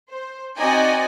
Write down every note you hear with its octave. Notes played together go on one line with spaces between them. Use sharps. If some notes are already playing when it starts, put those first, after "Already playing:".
C5
C4 D#4 F#4 D5 D#5 G#5